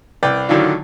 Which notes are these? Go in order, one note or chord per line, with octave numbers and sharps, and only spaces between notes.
C2 B4 D5 G5
A2 D3 D#3 F#3 D4 F4